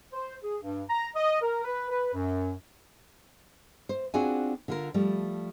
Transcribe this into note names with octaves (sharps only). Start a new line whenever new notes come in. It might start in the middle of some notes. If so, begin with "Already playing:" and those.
C5
G#4
G2
A#5
D#5
A#4
B4
B4
F#2
C5
C4 D4 F4 F#4 G#4 G#5
D3 F4 A#4
F3 G3 A3